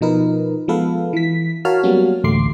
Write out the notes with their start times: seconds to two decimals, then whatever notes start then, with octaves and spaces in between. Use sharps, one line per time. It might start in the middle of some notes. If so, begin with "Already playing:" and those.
0.01 B2 F3 D#4 A#4 B4
0.68 F3 G#3 B3 A4 B4 F5
1.13 E3 B6
1.65 F#4 A#4 C#5 F5 A5 F6
1.83 F#3 G3 A#3 B3 C#4 F#4
2.24 A1 D2 A3 C6 D6 C7